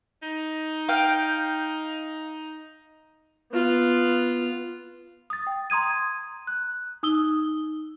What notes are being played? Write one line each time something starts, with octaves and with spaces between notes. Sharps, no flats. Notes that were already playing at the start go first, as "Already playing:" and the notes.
D#4
F5 G5
B3 F4
D#6 A6
G5
A#5 C6 D#6 G#6 D#7
F#6
D#4 D#6 E6 G7